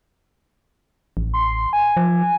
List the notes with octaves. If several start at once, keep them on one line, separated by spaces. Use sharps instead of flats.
A1
C6
G#5
F3